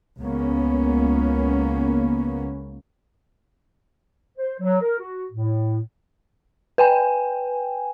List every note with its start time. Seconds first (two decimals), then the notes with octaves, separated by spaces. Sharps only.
0.23 C#2 A#3 B3 C#4
4.38 C5
4.60 F#3
4.81 A#4
4.99 F#4
5.32 A2
6.78 B4 G5 G#5